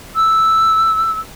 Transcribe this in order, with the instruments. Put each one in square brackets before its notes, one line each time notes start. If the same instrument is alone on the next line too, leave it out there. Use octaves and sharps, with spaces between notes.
[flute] E6